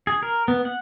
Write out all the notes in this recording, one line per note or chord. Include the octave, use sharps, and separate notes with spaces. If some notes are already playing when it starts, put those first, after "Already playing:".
G#4
A#4
B3
F#5